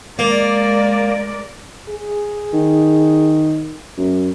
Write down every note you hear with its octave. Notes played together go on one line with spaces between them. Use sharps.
G#3 A#3 A#4 D5
G#4
D#3
F#2